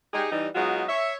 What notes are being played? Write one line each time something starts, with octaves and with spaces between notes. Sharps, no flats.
D#4 G4 G#4
E3 G3 D#4
F#3 G#3 B3 D#4 F4 F#4
C#5 E5